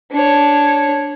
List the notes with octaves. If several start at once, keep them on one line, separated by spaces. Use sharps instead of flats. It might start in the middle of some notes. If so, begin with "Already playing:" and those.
D4 C#5